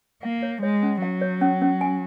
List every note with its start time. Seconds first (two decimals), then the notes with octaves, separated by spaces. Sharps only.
0.23 A#3 F5
0.43 C#5
0.62 G#3 C#5
0.83 C#4
1.02 F#3 F5
1.21 C#5
1.41 C#4
1.61 C#4
1.81 G#5